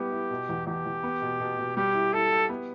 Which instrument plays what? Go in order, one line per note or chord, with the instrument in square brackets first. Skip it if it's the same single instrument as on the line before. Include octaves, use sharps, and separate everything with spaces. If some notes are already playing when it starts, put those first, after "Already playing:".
Already playing: [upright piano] G3 B3 E4 [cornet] G4
[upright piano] E4
B2
E2
[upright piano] E2 [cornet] G4
[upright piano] E2
B3
B2
B2
B2
[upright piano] G3 [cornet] G4
[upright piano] E4
[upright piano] E4 [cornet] A4
[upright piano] G4
B3